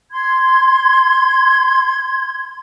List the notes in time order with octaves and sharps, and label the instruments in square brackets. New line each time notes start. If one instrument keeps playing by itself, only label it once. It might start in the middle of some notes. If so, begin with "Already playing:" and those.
[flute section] C6 G#6